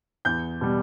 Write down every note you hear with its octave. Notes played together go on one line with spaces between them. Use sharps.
E2 G6
B2 G3